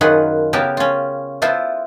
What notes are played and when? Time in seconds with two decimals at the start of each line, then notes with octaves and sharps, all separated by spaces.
0.01 F#2 D#3 F4 G#4 B4 F#5
0.53 C#3 B3 G4 A#4 A5
0.77 C#4 F4
1.42 B3 E4 F4 A4 C5